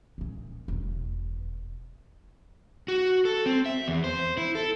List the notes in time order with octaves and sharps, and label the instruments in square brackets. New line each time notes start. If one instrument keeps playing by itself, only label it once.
[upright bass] A#2 C#3
E1 B2
[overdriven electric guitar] F#4
A4
C4
E5
E2
C5
E4
A4